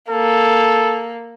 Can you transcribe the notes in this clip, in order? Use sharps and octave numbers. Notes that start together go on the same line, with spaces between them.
A#3 A4